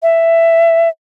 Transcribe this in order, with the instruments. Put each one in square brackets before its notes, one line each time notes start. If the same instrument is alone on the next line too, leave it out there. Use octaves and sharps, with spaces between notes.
[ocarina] E5